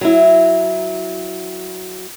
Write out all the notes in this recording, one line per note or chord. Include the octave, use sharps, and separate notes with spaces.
F#3 E4